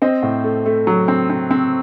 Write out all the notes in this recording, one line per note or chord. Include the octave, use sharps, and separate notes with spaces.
C4 C5 D#5
A2
A3
A3
F#3
C4
C4
C4